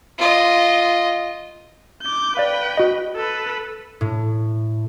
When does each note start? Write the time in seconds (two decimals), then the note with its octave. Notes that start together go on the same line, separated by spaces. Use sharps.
0.19 F4 D#5
2.02 D6 G6
2.37 B4 D5 F5 G5
2.77 F#4 D#5
3.16 A4 B4
4.01 A2